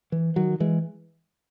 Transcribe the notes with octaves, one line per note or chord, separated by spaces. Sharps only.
E3
D#3 F#3
E3 G#3